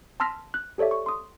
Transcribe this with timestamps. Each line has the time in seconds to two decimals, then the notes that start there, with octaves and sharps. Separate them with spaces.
0.20 A5 C6 E6 F6 A#6 B6
0.54 F#6
0.78 G4 A4 C#5 D5 E5
0.91 C#6
1.06 C6 D#6